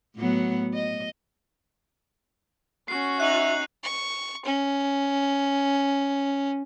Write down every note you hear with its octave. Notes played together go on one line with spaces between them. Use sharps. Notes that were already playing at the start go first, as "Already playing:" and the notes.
A2 F#3 B3
D#5
C#4 F#4 C7
D#4 E5 F#6 F#7
C#6
C#4